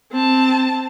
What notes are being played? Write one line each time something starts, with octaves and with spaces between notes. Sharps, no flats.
C4 A5